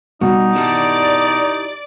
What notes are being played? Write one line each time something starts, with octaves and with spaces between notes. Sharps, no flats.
B2 G3 D#4 F#4
E4 G4 D5 A5